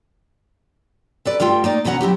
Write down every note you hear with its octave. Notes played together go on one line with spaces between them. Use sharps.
A4 B4 D5
G2 G3 A3 F4 G5
A#3 D#4 D5
D2 B2 E3 C#4 F#5 A#5
F#3 C4 E4 G4